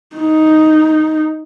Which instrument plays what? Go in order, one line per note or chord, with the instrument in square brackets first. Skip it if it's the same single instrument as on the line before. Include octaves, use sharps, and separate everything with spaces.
[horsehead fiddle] D#4